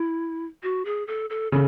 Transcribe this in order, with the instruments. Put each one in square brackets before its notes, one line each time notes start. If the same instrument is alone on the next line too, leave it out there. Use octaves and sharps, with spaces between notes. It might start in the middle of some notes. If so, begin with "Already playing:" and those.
Already playing: [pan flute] E4
F#4
G#4
A4
A4
[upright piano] C#3 [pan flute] A4